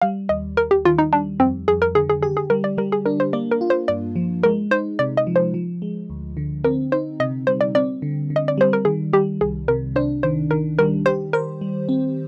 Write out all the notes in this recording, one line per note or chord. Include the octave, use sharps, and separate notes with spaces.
G3 F5
D#2 D#5
D#2 A#4
G4
D#3 F4
D#4
G3 D4
F2 C4
F2 G#4
A#4
D3 G#4
G#4
G4 G#4
G#4
G3 A#4
D5
G3 A#4
G#4
D4 A#4
C5
A#3 D5
A#4
F4
C5
G2 D5
F3
G#3 A#4
D#4 C5
C3 D5
D#5
F3
C5
F3
G#3
D2
D3
C4 A#4
D#4 C5
C3 D#5
G3 C5
D5
C4 D5
D3
D3
D#5
D5
G3 C5
A#4
D#3 G#4
G3 G4
C2 G#4
C3 A#4
D4 C5
D#3 C5
D#3 A#4
G3 A#4
G4 C5
A#4 C5
G3
C4